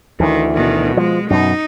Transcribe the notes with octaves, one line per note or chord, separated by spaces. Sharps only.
D2 D#3 E3
B2 D#3
F3 G#3
F#2 B2 D#4